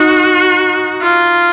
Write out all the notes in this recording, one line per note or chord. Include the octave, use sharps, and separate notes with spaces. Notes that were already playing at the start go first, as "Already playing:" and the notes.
Already playing: D#4 F#4
F4